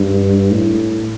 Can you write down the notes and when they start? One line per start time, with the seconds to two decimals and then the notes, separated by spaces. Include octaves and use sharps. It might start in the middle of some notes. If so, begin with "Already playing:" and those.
Already playing: G2
0.51 A2